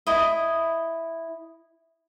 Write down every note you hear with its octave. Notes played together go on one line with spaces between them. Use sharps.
E4 D#5